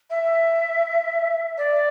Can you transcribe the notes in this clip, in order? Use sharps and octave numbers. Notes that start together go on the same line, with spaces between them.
E5
D5